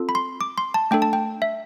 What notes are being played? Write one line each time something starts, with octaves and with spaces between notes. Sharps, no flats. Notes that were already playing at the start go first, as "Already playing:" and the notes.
Already playing: C4 F4 A4
B5
C6
D6
C6
A5
A3 D4 A4 G5
A5
G5
E5